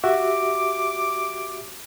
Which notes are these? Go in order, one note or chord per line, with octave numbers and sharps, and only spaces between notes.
F#4 G4 E5 D6